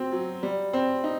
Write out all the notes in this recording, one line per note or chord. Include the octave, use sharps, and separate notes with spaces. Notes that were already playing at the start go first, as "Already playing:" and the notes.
Already playing: F#3 C4
F#3
G3
C4
D#4